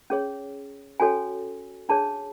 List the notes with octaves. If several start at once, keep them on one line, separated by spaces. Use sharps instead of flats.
C#4 G#4 C#5
C#4 F#4 A4 C#5 G#5
D4 G#4 C#5 A5